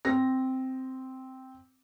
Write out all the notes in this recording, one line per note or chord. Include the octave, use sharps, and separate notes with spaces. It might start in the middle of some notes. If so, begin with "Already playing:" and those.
C4 A#6